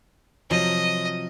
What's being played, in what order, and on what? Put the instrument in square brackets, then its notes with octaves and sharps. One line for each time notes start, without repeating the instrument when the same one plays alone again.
[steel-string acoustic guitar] C3 F3 F#3 [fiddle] D#5